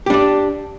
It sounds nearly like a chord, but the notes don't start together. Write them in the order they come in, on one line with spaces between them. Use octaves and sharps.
G4 D4 D5